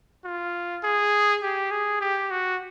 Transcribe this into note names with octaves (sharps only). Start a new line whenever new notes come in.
F4
G#4
G4
G#4
G4
F#4